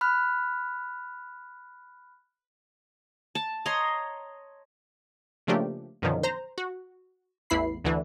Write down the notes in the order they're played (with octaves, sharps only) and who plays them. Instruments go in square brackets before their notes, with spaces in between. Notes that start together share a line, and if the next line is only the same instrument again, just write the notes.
[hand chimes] B5 F6 F#6
[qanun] A5
C#5 D#5 A#5 C6
[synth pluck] C#3 F3 A3 A#3 D4 G4
F#2 B2 D3 D#3 F3
C5 A#5
F#4
A1 E2 E4 B5 C7
D2 D3 E3